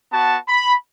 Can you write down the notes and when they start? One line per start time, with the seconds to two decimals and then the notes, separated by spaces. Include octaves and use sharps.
0.11 B3 F#4 A5
0.47 B5